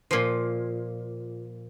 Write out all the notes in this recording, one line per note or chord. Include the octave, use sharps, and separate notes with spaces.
A#2 F3